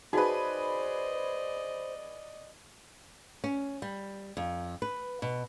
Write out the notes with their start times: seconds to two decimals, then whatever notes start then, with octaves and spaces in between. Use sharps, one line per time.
0.13 D#4 F#4 G#4 B4 C5 D5 D#5 F5
3.44 C#4
3.82 G3
4.37 F2
4.82 B4
5.22 B2